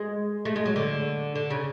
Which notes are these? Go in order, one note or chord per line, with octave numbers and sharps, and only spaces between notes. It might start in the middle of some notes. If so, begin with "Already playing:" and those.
Already playing: G#3
A3
G#3
F#3
D3
D3
C#3